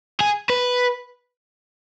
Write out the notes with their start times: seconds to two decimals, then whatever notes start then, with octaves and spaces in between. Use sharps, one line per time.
0.21 G#4
0.50 B4